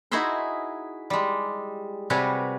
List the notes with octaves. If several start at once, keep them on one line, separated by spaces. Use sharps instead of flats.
D#4 E4 F#4 G#4 E5 C6
G3 G#3
C3 G3 F#4 B4 C#5 G#5